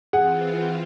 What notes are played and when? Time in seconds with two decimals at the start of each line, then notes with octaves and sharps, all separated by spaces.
0.13 E3 C4 F4 G#4 F#5